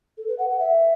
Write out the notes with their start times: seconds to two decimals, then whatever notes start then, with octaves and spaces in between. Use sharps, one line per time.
0.18 A4
0.28 B4
0.38 F#5
0.49 F#5
0.59 E5